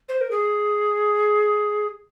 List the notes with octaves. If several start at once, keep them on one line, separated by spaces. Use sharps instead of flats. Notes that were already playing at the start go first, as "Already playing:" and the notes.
C5
A#4
G#4